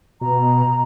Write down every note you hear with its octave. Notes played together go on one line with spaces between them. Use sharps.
B2 A#5